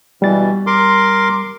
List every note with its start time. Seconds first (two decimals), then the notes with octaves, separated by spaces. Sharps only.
0.22 B2 E3 G3 A6
0.67 A#4 C6 D6